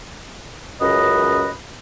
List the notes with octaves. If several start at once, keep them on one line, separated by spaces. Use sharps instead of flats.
C#2 F#2 B4 D#5